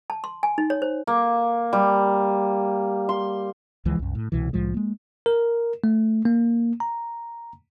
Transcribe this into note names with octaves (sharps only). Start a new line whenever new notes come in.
A5
C6
G#5
D#4
C#5
C5
A#3
G3
C6
C#2 E3 F3 G#3
C2 F#2
A2
C2 B2 E3
C2 A2 F3 G#3
G#3 A#3
A#4
A3
A#3
A#5